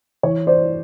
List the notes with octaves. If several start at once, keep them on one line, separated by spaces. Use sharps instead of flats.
E3 C#5
C5 D5